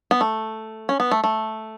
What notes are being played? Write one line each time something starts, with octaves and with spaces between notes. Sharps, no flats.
B3
A3
C#4
B3
A3
A3